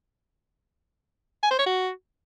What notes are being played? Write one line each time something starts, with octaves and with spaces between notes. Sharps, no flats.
G#5
C5
C#5
F#4